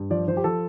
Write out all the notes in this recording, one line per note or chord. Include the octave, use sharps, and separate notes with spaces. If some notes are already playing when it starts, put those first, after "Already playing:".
Already playing: G2
F3 D5
F3 C5
G4
F3 A4